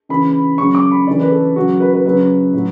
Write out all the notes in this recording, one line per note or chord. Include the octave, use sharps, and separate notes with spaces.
C#3 E3 B5
C#3 F#3 C#6
D6
B5
C#3 E3 D5
B4
A4
C#3 F#3 F#4
B4
B4
C#3 F#3 B4
A2 F#3